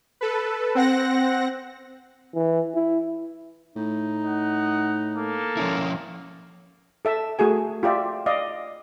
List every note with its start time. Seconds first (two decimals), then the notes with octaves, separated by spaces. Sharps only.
0.21 A4 B4
0.75 C4 F#5 A#6
2.34 E3
2.75 E4
3.76 A2 D#4
4.24 D#5 F#5
5.15 A#3 A4
5.57 F3 C#4 E4
7.05 A4 E5 A5
7.39 A3 F#4 G#4 G#5
7.83 F4 G4 D5 E5
8.26 D5 D#5 F5